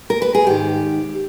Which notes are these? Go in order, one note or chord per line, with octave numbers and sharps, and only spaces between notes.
A#4
B4
G#4
G#2 D#3 G4